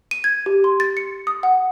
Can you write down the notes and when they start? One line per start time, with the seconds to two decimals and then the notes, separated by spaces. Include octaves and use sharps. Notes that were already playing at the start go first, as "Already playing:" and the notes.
0.11 D#7
0.24 G#6
0.46 G4
0.64 C6
0.80 A6
0.97 C#7
1.27 D#6
1.43 F#5